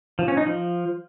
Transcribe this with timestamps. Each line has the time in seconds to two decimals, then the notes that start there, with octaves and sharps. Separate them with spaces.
0.19 F3
0.28 C#4
0.37 D#4
0.46 F3